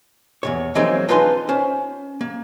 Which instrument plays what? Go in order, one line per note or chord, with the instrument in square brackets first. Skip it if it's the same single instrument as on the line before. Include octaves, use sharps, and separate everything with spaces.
[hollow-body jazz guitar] E2 A#2 C#5
E3 F#3 G#3 A#3 C4 D#4
D4 D#4 F4 B4 G#5 C6
C#4 C5
A#3